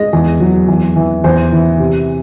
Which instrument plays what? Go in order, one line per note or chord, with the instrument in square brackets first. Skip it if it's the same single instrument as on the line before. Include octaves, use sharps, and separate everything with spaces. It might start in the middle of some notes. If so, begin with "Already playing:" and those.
Already playing: [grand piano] G#3 D#5
E2
F#3
E2
E3
E2 C5
E3
C3